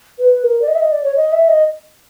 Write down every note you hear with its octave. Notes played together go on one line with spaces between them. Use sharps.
B4
A#4
D5
D#5
E5
D#5
D5
C#5
D#5
E5
D#5